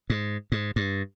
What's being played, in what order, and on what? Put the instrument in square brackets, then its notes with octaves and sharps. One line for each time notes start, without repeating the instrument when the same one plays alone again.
[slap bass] G#2
G#2
G2